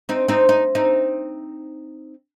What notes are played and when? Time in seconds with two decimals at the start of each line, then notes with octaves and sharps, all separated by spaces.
0.09 C4 D#4
0.28 C4 D#4
0.49 D#4
0.75 C4 D#4